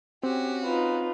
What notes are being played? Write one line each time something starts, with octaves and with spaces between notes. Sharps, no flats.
C4 C#4 F#4 G4
D#4 F4 B4